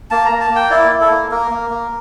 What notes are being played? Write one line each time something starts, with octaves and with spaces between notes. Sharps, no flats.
A#3 A5
A#5
A#3
A5
A#3 G5
E4 D5
E4
A4
A#3
A#3 A#4
A#3
A#3